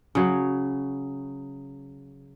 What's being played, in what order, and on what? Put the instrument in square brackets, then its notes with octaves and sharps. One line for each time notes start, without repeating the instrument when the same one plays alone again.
[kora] C#3 F#3